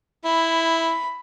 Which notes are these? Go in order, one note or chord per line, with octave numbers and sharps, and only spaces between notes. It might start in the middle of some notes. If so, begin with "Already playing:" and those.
E4 B5